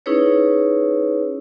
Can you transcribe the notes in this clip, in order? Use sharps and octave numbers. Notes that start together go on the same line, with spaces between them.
C#4 D#4 E4 G#4 B4 C#5